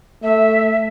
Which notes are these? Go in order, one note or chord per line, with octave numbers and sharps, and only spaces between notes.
A3 E5